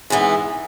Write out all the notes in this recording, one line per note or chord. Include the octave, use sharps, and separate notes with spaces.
G#2 E3 B3 E4